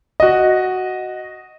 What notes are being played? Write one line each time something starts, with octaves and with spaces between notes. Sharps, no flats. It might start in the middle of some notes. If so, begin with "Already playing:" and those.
F#4 D#5